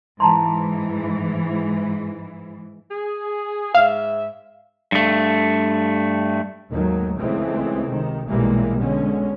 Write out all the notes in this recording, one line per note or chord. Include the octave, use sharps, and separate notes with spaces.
G#2 E3 A5 A#5 C6
G#4
G#2 E5 F5
G2 A3
D#2 G#2 D#3 F#3 A3
C#2 C#3 E3 G#3 A3 C4
C3 D#3
B1 A#2 E3 G3 G#3 A#3
B2 D3 G#3 C#4